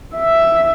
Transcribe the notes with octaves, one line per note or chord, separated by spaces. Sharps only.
E5